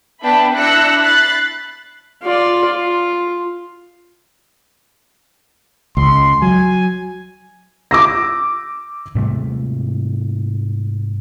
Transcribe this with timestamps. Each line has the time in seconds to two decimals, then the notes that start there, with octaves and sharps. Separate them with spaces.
0.23 B3 D4 E5 G5 A5 B5
0.55 D4 E4 E6 F#6 A#6 C#7
1.00 B5 F#6 A6 C7
2.23 F4 D5
2.65 F4
5.97 C#2 C6
6.42 F#3 G#5
7.91 D6 E6 A#6
9.15 G#2 C3 G3 A3